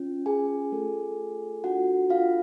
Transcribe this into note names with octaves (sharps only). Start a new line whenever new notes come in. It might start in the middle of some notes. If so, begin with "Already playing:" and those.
Already playing: C#4 F4
G#4 G#5
A3 F4 A4
D4 F4 F#4 A4 F#5
F4 F5